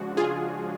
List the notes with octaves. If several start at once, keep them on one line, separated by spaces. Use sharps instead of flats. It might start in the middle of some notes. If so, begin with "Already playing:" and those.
Already playing: C#3 F3 G#3 D4 F#4
F4 G#4